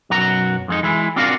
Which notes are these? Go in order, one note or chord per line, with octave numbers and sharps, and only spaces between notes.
B1 F#2 F#4 A#5
F2 G#3 D#4
E3 G#3 E4
C4 D4 F4 F#4 A#4 F5